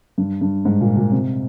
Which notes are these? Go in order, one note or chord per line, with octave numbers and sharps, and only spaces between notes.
G2
G2
G#2
A#2
A#2
C3